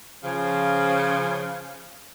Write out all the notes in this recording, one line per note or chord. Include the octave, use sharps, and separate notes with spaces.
C#3 F3